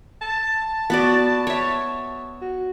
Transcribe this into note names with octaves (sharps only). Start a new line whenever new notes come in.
A5
B3 F#4 D5
C#5 E5
F#4